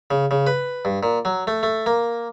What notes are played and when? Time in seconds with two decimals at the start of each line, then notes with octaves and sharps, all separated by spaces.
0.11 C#3
0.31 C#3
0.47 B4
0.85 G2
1.03 A#2
1.25 F#3
1.47 A3
1.63 A3
1.86 A#3